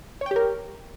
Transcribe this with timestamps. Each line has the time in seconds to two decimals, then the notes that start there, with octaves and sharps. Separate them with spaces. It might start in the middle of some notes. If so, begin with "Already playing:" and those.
0.21 C#5
0.26 G5
0.31 G4
0.36 A#4